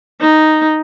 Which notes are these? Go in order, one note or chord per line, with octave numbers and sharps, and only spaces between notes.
D#4